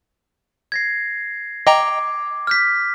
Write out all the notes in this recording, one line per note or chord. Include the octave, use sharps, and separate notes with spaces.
G#6 A#6 C7
D#5 G5 A#5 D6 D7
F6 G6 B6